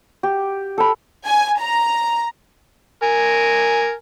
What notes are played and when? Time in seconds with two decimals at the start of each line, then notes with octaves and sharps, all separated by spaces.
0.23 G4
0.78 A4 B5
1.26 G#5
1.60 A#5
3.03 A#4 G#5